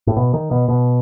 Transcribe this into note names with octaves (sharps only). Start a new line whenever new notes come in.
A2
B2
D#3
B2
B2